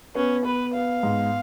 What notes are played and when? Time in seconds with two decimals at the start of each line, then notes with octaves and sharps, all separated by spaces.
0.15 B3 C#4
0.45 B3 B4
0.74 B3 F5
1.03 G#2